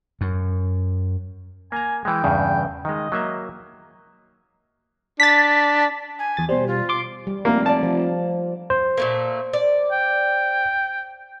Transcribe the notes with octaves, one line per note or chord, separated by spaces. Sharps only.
F#2
A#3 G#5 A#5
E3 G#3 G5
E2 G2 C#3
D#3 G#3 D#5
F#3 A#3 E5
D4 A6 B6
G#5
E2 A6
B2 G3 C5
F4
C6 D6
G3
F1 A#3
D5 A5
F3
C5
A#2 A3 A#3
D5
G5